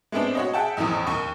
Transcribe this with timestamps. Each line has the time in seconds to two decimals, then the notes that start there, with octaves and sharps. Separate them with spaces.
0.12 G#3 A3 B3 C4 D4
0.35 F#4 C#5 D#5
0.53 G#4 E5 F#5 G5 A5
0.77 A1 E2 A2 F3 D#6
1.07 D#2 C#6